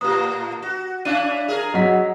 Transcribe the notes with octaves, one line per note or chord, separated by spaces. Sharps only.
A2 A#3 G4 B4 D#6
F#4
C#4 D4 E4 F5 D#7
G#4 A#4
F#3 D#5 F#5 B6